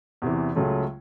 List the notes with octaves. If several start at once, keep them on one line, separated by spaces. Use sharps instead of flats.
E2 C3 E3
C#2 C#3 F#3 A3